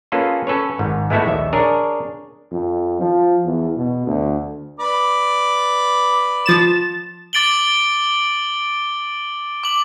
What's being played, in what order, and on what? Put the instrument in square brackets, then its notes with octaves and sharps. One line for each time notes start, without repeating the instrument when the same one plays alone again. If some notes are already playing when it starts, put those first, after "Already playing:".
[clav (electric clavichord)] A#3 C#4 F4 G#4 A4 B4
C#4 A4 B4 C#5
G#1 G#2
G#3 A3 B3 E4 F#4 A4
A#1 D#2 E5
D4 G#4 A#4 C#5
[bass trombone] F2
F3
E2
B2
D2
[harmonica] B4 D5
[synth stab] F3 A6 E7
[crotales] D6 A6 D7 F#7 G7
D6 F#7